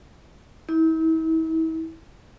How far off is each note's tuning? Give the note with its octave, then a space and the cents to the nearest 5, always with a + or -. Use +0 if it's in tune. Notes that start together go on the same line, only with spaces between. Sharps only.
E4 -40